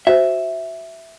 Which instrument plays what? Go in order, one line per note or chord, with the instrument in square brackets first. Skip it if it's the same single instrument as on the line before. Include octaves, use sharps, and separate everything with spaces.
[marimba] F#4 C5 [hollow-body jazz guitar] E5